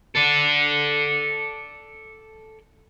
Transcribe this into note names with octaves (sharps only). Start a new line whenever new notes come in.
A4 D5